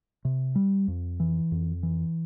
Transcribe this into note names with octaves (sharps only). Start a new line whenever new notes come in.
C3
G3
F2
E3
F2
E3